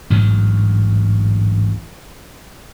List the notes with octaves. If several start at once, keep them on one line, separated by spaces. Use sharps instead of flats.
A1 D2 G#2 F#3